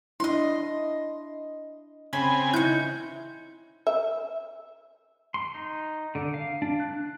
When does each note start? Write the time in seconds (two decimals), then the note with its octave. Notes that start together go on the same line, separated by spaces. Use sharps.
0.20 D4 E4 D#5 C6
2.13 C#3 C4 G#5 B5
2.54 D#4 E4 G6
3.87 E5
5.34 C6
5.54 D#4
6.15 D3
6.34 F5
6.62 D4
6.80 F#6